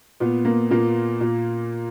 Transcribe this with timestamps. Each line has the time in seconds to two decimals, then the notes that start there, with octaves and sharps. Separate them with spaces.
0.20 A#2 B3
0.45 A#3
0.71 A#2 A#3
1.21 A#2